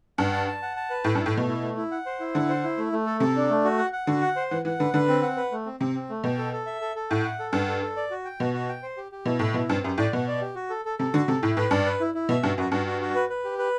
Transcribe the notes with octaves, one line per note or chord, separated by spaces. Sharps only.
G2 F#5
A5
A5
F#5
A5
B4
A2 E4
G2
E4
A2
B2 A3
E4
A3
E4
F#5
C5
E4
D3 F#5
C5
E4
A3
A3
A4
C3 A4
D4
A3
F#4
F#5
F#5
D3 F#4
F#5
C5
E3 F#5
E3 F#5
D3 B4
D3 B4
C4
F#5
B4
A3
C4
C3 C4
C4
A3
B2 G5
A4
A4
E5
A4
A4
A2 F#5
F#5
A4
G2 F#5
A4
A4
D5
F#4
G5
B2 F#4
F#4
G5
C5
G4
G4
B2 E4
A2 E4
B2 E4
G2 C4
F#2 G4
A2 D5
B2 F#5
D5
G4
F#4
A4
A4
C3 A4
D3 F#4
C3 A4
A2 E4
A2 B4
G2 D5
B4
E4
E4
B2 E5
G2 F#4
F#2 F#4
G2 F#4
F#4
F#4
B4
B4
G4
B4